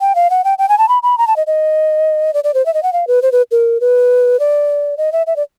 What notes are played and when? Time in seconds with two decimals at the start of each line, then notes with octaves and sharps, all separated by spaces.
0.01 G5
0.15 F5
0.30 F#5
0.44 G5
0.58 G5
0.69 G#5
0.78 A5
0.89 B5
1.03 B5
1.18 A#5
1.27 A5
1.36 D#5
1.47 D#5
2.34 D5
2.44 D5
2.54 C5
2.66 E5
2.74 D#5
2.83 F#5
2.93 F5
3.07 B4
3.22 C5
3.32 B4
3.51 A#4
3.81 B4
4.40 D5
4.97 D#5
5.12 E5
5.27 E5
5.36 D5